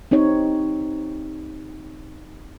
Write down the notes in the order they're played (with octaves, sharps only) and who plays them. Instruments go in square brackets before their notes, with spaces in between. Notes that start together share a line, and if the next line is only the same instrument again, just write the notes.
[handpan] C4 D#4 G4 C#5